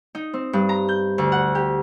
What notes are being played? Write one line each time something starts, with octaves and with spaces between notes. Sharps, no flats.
D#4
C4
G2
A#5
G6
D2
F#5
G4